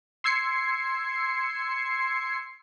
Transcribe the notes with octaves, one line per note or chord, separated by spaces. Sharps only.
C6 E6 G#6 C7 C#7